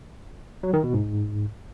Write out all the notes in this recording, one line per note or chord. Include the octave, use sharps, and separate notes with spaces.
F#3
D#3
B2
G#2